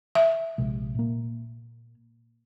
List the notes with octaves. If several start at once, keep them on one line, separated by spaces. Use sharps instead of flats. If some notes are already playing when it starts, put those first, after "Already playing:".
E5
A#1 C3 G#3
A#2 A#3